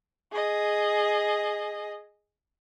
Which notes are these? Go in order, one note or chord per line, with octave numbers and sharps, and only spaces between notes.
G#4 D#5